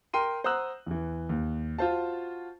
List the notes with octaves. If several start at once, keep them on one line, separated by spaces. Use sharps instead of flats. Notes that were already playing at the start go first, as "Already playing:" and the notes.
A#4 G5 C6 D#7
C5 F#5 A#5 D#6 E6 F#6
E2 E3
D#2
F4 F#4 C5 F5 A5